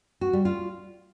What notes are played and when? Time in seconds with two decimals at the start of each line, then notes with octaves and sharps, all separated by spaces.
0.21 F#4
0.33 G3
0.45 F4